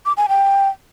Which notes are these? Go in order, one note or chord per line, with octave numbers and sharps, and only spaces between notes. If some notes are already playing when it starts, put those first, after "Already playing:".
D6
G#5
G5